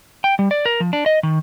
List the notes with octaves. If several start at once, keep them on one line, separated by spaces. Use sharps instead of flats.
G5
G3
D5
A#4
F3
D4
D#5
D#3